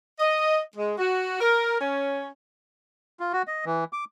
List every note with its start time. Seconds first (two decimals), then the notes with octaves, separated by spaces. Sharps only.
0.19 D#5
0.77 G#3
0.98 F#4
1.41 A#4
1.81 C#4
3.20 F4
3.33 F#4
3.47 D#5
3.65 E3
3.93 D6